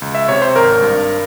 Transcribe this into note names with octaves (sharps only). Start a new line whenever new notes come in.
C#2
E5
C3 C#5
C5
G#1 A#4
G2